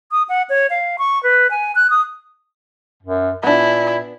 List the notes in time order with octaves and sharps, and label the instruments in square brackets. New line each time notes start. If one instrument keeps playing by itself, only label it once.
[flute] D#6
F#5
C#5
F5
C#6
B4
G#5
F#6
D#6
[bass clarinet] F#2
[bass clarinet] A#2 [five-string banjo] B3 D4 [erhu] E4